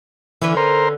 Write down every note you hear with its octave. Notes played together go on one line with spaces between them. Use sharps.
D3 E3 C#4 B4
A#4 C5